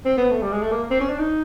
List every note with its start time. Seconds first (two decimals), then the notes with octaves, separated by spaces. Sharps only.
0.05 C4
0.18 B3
0.30 A3
0.42 G3
0.53 G#3
0.62 A3
0.72 A#3
0.91 C4
1.00 C#4
1.09 D4
1.19 D#4